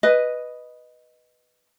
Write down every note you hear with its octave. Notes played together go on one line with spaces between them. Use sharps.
B4 D#5